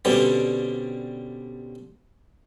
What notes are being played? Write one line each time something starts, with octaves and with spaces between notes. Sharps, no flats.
B2 D3 G3 C4 C#4